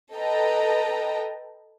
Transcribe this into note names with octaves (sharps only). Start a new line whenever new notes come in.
A4 B4 D#5 G5 A5 A#5